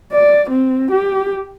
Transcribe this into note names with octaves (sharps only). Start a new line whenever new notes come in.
D5
C4
G4